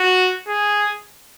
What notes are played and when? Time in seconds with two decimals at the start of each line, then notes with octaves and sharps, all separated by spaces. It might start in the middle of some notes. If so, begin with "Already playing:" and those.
Already playing: F#4
0.48 G#4